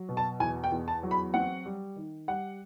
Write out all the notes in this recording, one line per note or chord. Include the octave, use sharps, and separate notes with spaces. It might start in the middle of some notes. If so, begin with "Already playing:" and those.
Already playing: F#3
B2
A5
E2 G#5
G5
E2
A5
F#3
B5
C4 F#5
G3
D#3
G3 F#5